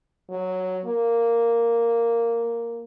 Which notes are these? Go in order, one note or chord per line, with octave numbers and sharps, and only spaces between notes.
F#3
A#3